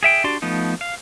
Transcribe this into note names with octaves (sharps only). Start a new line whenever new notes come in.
G#4 E5 G5
D4 F#4 G4 D5 C6
F3 A3 B3 D#4
F5